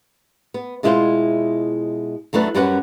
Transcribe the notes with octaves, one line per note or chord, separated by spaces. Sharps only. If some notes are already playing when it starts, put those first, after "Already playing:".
B3
B2 G#3 E4 F4 B4 C5
E2 F#3 A3 D4 B4
F#2 G3 C#4 F#4 B4 F#5